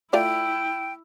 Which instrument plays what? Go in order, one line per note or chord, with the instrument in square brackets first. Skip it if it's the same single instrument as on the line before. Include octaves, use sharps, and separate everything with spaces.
[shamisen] A3 F4 D5 [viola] E4 [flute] G5